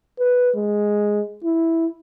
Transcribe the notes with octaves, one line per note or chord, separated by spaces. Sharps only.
B4
G#3
E4